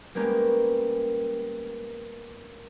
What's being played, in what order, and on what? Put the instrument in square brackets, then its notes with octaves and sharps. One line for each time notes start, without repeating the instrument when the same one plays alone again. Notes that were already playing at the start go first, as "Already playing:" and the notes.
[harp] G3 G#3 A#3 B3 C#4 G4